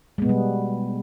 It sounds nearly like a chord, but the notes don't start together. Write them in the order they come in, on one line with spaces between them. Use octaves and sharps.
G#3 B3 B2 G3